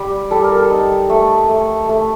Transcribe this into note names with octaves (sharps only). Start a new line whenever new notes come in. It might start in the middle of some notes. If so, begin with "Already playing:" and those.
Already playing: G3 G4
G3 A4
A#4
A4
D#4
A3
A3
A3